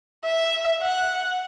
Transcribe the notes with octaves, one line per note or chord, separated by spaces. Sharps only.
E5
F#5